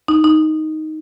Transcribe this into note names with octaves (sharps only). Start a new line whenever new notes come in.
D#4
D#4